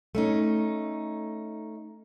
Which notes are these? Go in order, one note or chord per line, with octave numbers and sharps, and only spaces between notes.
A3 C#4 D#4